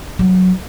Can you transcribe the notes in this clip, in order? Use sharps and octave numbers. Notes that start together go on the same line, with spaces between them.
F#3